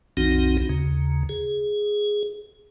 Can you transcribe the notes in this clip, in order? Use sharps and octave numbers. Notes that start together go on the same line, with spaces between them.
B1 F2 D#3 C4 D#4 F#4
D#2 C#3
G#4